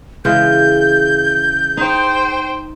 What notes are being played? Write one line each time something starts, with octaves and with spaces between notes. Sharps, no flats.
C#3 E3 G#3 G6
D#4 C5 G5